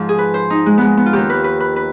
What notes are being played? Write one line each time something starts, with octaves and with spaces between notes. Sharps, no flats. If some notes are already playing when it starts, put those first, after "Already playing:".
Already playing: G#2 F3
G#4
B4
C5
D#4
G#3
G#3 B3
B3
F4
D#2 D#3 G4
B4
B4
B4
B4